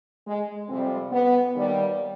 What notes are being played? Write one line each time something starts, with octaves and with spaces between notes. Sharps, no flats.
G#3
F2 C3 G3 C4
B3
D#2 D#3 G3